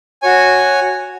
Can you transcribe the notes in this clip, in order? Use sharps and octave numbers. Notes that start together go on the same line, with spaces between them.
F#4 C#5 G#5